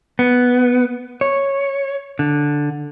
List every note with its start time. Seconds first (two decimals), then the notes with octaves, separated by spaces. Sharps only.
0.19 B3
1.21 C#5
2.19 D3